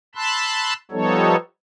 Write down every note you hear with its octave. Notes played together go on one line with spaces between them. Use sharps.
A5 B5 C6 E6 F#6
F3 G3 B3 D#4 A4 C#5